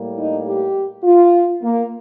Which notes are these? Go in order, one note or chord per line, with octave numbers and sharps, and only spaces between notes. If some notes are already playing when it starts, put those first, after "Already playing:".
Already playing: A2 G3 A#3
D#4
G4
F4
A#3